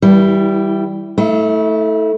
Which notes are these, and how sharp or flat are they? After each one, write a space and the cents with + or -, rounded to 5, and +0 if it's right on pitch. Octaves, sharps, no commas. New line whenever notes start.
E3 -40 G3 -10 E4 +0
A3 +0 E4 -35 E5 +40